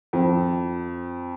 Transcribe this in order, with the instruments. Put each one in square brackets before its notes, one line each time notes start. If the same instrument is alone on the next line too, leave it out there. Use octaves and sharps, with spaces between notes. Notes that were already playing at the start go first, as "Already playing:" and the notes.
[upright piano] F2